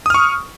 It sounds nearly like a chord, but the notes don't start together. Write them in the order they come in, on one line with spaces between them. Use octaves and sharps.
D#6 F6 C#6